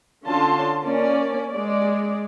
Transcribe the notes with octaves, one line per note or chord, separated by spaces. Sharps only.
D3 C#4 F4 A5 C6
A#3 C#4 D5
G#3 D5